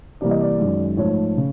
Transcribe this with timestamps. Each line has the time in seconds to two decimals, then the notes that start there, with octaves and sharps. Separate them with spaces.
0.21 C3 E3 G3 A#3 D5
0.31 D#5
0.41 D5
0.60 F#2 D#3 G#3
0.97 G#2 F3 A3 C#5
1.37 C#3